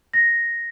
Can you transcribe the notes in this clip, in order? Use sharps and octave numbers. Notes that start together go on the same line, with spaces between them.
A#6